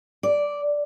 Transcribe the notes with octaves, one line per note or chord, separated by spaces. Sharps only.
D5